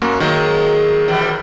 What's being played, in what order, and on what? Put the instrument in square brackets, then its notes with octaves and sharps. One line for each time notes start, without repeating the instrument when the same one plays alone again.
[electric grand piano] F#2 A#3 F#4
[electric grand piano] D#3 F#3 A#3 [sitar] G#3
[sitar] B2 E3 G3